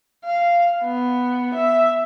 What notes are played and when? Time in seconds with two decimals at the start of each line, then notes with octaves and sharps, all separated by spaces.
0.25 F5
0.84 B3
1.54 E5